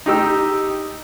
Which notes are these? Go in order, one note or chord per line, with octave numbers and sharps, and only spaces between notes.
D#4 G4 E6